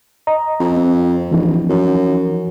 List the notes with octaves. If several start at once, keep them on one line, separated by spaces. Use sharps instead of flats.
D#5 A#5
F2
C4
D1 E3 F3 D#4
F#2